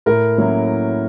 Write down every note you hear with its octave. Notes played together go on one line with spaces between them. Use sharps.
A2 A#4
F#3 A#3 C#4 E4